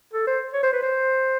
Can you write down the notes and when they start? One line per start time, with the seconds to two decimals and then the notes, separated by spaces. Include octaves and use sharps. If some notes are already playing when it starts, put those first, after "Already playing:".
0.13 A4
0.27 C5
0.53 C#5
0.63 C5
0.73 B4
0.82 C5